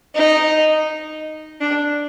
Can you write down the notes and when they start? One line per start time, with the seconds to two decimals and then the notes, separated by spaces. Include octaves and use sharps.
0.15 D#4
1.61 D4